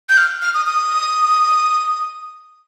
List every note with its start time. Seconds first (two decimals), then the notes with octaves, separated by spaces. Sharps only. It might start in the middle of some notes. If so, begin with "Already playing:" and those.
0.09 G6
0.18 F6
0.42 F6
0.54 D#6
0.66 D#6